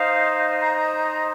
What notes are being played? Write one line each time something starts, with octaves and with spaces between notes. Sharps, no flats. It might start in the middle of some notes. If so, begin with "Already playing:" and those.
Already playing: D#4 C5 F5
A#5